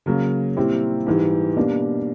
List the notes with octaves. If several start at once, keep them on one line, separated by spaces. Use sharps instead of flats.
C#3 F#3 A#3
A#2 G3 C4 E4 G4
G#2 E3 G3
B2 G3 A#3 D4